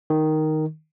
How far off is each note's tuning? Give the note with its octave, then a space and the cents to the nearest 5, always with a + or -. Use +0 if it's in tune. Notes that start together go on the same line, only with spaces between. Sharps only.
D#3 +0